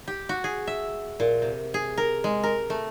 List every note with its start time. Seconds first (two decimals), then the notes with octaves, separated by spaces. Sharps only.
0.08 G4
0.29 F#4
0.44 G#4
0.67 E5
1.20 A#2
1.42 C3
1.74 G#4
1.98 A#4
2.24 G#3
2.44 A#4
2.70 A3